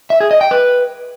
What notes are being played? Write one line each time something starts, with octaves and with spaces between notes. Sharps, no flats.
E5
G#4
D#5
G5
B4